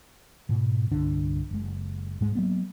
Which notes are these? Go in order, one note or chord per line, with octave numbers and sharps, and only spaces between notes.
G#2 B2
C2 G2 D3 D4
F#1 G#3
G#2 G#3
F#3 A#3 B3